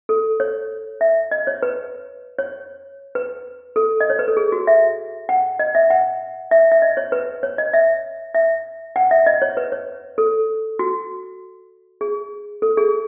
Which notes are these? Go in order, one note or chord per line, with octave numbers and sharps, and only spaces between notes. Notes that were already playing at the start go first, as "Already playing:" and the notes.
A4
C#5
E5
D#5
C#5
B4
C#5
B4
A4
D#5
C#5
B4
A4
G#4
F#4
E5
F#5
D#5
E5
F#5
E5
E5
D#5
C#5
B4
C#5
D#5
E5
E5
F#5
E5
D#5
C#5
B4
C#5
A4
F#4
G#4
A4
G#4